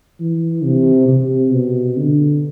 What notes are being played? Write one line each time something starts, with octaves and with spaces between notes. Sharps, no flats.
E3
C3
C3
B2
D3